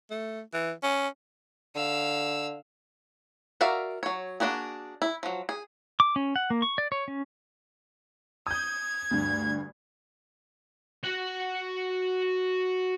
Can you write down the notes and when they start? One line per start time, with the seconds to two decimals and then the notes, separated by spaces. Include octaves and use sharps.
0.11 A3
0.53 E3
0.83 C#4
1.76 D3 F5 E6
3.61 F#4 A#4 D5 E5 F5
4.03 F#3 C#5
4.40 A#3 D4 E4 F#4 G#4
5.02 E4
5.23 F3 F#3
5.49 G#4
6.00 D6
6.16 C#4
6.36 F#5
6.50 A#3
6.62 C#6
6.78 D5
6.92 C#5
7.08 C#4
8.47 D#6 G6 G#6
9.11 D2 G2
11.04 F#4 F#5